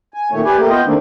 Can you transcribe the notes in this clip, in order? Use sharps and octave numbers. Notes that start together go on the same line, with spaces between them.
G#5
A#2 D#3 A3 C#5
G4 B4 D5 G#5
A3 A#3 G4
B3 F4 D#5 G5
D#3 A3 A#3 C4 D4